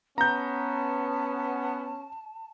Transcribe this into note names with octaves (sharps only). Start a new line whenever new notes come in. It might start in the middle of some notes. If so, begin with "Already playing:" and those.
B3 C#4 A5 A#5 G6